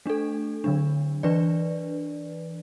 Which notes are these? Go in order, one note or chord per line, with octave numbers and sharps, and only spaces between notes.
A3 D4 A4
D3 F#3 D4
E3 D4 B4 D5